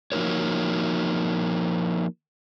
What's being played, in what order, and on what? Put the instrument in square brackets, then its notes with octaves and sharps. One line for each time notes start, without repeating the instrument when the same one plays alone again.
[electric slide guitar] F3 A#3 D#4 F#4 A#4 C#5